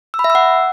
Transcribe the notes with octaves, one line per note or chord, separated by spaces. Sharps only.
E6
B5
E5
E6
F#5